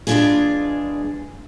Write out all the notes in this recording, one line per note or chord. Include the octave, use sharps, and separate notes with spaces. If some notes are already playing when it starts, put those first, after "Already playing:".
E2 G#3 B3 D4 F4 G#4